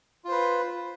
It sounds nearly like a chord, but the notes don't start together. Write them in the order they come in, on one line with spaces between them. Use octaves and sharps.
F4 C5 B4